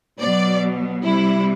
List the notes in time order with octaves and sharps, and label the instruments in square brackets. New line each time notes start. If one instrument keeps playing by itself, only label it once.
[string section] B2 F#3 D5
C3 G3 E4